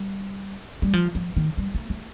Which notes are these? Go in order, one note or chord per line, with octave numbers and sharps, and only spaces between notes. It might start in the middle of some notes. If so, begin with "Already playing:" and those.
Already playing: G3
G3
F3
F3
D#3
G3
A3
A3